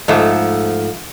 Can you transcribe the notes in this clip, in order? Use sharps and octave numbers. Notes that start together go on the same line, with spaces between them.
G#2 F3 A3